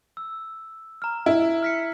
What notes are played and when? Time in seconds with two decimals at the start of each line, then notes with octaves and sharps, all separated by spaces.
0.17 E6
1.02 A#5 F6
1.26 E4
1.63 F6 B6 C#7